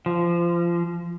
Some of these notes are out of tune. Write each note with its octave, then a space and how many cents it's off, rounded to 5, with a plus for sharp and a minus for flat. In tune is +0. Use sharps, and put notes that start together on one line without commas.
F3 -25